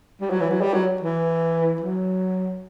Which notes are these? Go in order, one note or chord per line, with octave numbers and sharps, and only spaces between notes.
G3
F#3
E3
F#3
G3
F#3
E3
F#3